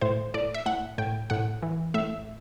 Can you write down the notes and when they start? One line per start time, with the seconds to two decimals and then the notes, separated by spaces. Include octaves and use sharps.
0.01 A2 C5
0.34 A2 D5
0.54 E5
0.66 A2 F#5
0.98 A2 G5
1.30 A2 F#5
1.62 E3
1.94 A2 E5